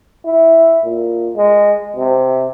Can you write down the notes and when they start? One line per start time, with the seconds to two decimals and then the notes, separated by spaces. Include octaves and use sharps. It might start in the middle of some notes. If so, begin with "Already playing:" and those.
0.25 E4
0.84 A#2
1.36 G#3
1.96 C3